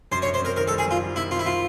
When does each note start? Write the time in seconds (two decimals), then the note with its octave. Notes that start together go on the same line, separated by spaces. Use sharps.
0.11 F#2 C5
0.22 C#5
0.27 F#2
0.34 C5
0.42 C4 A#4
0.56 D#3 A#4
0.68 A4
0.71 G3
0.78 G#4
0.86 G3 F4
1.02 G3
1.16 D#3 E4
1.31 C4 F4
1.39 E4
1.46 F4